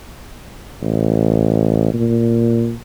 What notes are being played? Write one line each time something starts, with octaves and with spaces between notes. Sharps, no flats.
A1
A#2